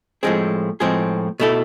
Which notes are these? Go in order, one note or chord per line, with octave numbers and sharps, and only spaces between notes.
A2 F3 G#3 C4 G#4
A2 F3 G#3 C4 G#4
B2 A3 E4 A4